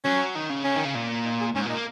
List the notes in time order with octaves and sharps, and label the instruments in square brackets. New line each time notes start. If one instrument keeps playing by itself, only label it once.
[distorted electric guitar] F#3 [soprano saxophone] C#4
[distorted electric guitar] D#3
C#3
[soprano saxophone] C#4
[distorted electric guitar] D#3
C#3
A#2
[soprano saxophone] D#4
G#4
[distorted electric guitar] G#2 [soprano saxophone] C#4
[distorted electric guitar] A#2 [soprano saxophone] D#4
[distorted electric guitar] A#3